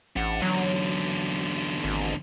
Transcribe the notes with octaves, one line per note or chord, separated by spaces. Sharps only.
A1 D4 F#5
E2 D3 F#3
G#1